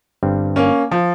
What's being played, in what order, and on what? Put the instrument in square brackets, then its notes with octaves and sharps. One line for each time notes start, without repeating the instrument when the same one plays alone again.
[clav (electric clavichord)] G1 G2 G3 C4
[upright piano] A#3 C#4
F3